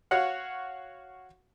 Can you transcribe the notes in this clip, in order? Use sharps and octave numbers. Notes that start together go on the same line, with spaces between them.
F#4 C#5 F5 F#5